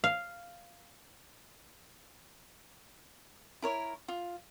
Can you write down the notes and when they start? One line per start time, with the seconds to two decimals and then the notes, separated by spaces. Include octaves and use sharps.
0.04 F5
3.62 E4 A#4 C#5
4.08 F4